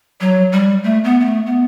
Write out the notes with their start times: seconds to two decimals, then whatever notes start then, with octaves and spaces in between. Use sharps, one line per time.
0.21 F#3
0.52 G3
0.84 A3
1.04 B3
1.20 B3
1.25 A3
1.46 B3